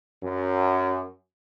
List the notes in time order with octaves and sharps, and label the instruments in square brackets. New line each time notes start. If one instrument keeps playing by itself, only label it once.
[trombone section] F#2